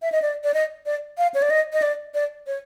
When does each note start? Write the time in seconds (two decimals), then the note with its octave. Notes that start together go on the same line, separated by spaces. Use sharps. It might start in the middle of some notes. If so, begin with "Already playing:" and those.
0.02 E5
0.12 D#5
0.22 D5
0.44 D5
0.54 D#5
0.86 D5
1.18 F5
1.34 C#5
1.42 D5
1.50 D#5
1.73 D#5
1.82 D5
2.14 D5
2.47 C#5